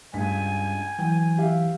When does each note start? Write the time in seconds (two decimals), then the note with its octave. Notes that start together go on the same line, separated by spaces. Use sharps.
0.13 C#2 G2 G#5 B6
0.99 E3 F#3 G5
1.38 G4 E5 F5